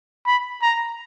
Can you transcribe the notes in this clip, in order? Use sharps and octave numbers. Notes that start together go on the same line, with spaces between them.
B5
A#5